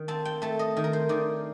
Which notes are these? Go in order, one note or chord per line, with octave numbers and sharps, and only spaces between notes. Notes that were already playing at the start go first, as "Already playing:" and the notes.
Already playing: D#3
C4 A5
G5
A3 A5
D#5
D#3
A#4
C5
D#3 D5